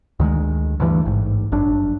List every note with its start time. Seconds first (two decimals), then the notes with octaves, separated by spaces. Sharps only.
0.20 D2 D#3 F#3 G#3
0.80 D2 G2 E3
1.06 A1 G#2
1.52 G1 F#2 D4